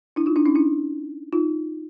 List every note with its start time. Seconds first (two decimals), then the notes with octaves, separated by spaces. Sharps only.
0.16 D4 E4
0.26 D#4 F4
0.36 D4 E4
0.46 C#4 D#4
0.55 D4 E4
1.33 D#4 F4